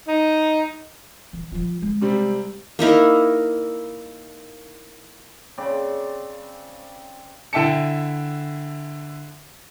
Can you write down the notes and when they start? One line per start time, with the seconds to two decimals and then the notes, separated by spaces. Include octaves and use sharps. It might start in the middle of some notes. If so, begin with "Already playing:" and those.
0.08 D#4
1.33 E3
1.52 F3 F4
1.82 G#3
2.02 C3 G3 C4
2.79 A#3 D#4 E4 A#4
5.58 C#3 C4 D5 B5
7.53 D3 E4 E5 G5 A5 C#7